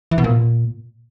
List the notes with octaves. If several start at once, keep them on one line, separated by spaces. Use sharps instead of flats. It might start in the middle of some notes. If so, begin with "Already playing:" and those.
E3
B2
A#2